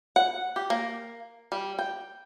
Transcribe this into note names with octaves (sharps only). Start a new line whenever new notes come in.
F#5
G4
A#3
G3
G5